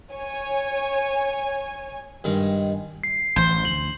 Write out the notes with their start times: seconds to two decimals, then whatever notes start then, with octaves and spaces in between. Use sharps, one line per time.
0.13 C#5 G#5
2.24 G2 D#3 G#3
3.03 C7
3.36 A1 E3 F3 C5
3.65 D2 F#7